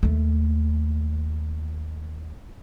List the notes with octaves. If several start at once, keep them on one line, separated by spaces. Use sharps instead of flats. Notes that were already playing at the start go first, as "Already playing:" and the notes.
D#2 A3